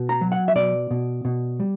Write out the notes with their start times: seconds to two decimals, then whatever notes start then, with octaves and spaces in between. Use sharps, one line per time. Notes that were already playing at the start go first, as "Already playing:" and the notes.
Already playing: B2
0.09 A#5
0.21 F#3
0.32 F#5
0.48 E5
0.55 B2 D5
0.91 B2
1.25 B2
1.60 G3